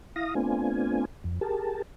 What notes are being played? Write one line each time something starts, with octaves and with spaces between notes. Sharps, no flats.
E4 F5 D#6 A#6
A3 B3 C4 D4 F4 G#5
F2
G4 G#4 A#4 A5